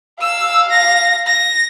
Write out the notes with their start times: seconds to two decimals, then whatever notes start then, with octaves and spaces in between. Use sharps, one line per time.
0.21 F5 E6
0.71 A#6
1.27 A#6